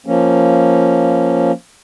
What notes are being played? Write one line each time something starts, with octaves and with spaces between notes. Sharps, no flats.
F3 A#3 C#4